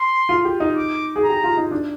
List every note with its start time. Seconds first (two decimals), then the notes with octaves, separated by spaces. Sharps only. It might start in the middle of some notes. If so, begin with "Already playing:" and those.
Already playing: C6
0.29 F4
0.45 G4
0.60 D#4
0.77 D6
1.16 G#4
1.24 A#5
1.30 G4
1.44 F4
1.57 D#4
1.71 D4